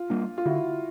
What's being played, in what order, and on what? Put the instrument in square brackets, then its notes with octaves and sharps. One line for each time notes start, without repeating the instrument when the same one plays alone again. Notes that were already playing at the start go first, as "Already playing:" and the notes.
Already playing: [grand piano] F4
[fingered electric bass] G3 A#3 D4
[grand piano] F4
[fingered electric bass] D3 [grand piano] E4 F#4